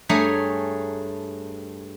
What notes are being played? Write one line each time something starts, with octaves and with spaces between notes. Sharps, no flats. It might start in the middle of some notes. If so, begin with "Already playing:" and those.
G2 A3 G#4 C#5 G#5 A#5